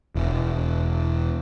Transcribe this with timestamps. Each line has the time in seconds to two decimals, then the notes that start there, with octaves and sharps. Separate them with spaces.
0.15 E1